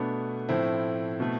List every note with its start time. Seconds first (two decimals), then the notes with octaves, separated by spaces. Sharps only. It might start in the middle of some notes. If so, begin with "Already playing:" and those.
Already playing: B2 A3 B3 D4
0.49 A2 F3 A3 C4 E4
1.20 B2 A3